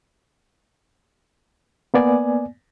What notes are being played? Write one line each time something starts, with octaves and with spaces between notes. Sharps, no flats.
A#3 B3 D5 G#5